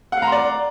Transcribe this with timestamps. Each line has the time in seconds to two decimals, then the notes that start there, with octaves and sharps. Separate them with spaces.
0.12 F#5
0.17 F5
0.22 A#5
0.27 C6
0.32 D5